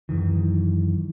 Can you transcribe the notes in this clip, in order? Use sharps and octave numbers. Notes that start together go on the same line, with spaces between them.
F#2 D#3 E3